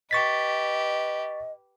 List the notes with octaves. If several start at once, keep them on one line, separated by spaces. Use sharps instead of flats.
G4 B4 D#5 C#6 A6 B6